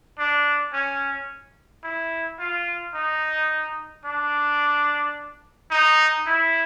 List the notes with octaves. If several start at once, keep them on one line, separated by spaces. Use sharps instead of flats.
D4
C#4
E4
F4
D#4
D4
D#4
E4